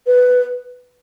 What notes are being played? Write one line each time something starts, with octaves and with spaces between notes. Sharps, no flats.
B4